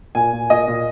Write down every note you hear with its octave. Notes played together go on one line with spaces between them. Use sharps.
A#2 G#5
A#2
A#2 D#5
A#2